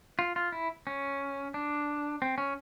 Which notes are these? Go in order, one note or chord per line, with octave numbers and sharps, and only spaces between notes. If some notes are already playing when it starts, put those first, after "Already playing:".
F4
F4
E4
C#4
D4
C4
C#4